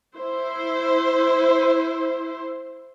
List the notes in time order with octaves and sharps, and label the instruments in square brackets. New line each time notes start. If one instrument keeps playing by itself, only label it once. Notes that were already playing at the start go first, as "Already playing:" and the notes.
[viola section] E4 C5